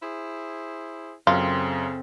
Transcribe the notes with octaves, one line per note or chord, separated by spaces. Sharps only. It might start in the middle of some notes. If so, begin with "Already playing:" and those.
E4 G#4 C5
F#2 C#3 C4 F4 A4